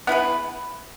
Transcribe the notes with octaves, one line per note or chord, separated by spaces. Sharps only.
B3 E4 G#4 B4